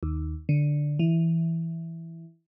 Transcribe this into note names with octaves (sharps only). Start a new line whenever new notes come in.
D#2
D3
E3